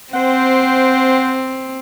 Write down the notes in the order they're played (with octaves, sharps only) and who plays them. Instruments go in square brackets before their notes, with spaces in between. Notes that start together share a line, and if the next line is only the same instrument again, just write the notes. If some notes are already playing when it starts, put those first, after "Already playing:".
[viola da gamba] C4 [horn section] C5 F#5 G5